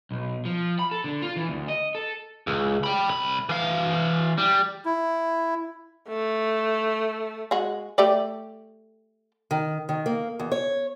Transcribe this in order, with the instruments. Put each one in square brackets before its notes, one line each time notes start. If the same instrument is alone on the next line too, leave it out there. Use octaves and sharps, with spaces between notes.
[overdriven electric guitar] B1
F3
B5
A4
D3
F4
E3
D2
D#5
A4
C#2
G5 B5
C2 B5
E3 F5
G3
[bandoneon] E4
[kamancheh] A3
[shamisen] G#3 F#4
A3 G4 D5
[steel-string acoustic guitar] D#3
D#3
A#3
E2
C#5